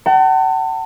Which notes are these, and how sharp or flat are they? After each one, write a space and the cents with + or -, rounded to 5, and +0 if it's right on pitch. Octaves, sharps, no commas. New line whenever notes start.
F#5 +45 A5 +35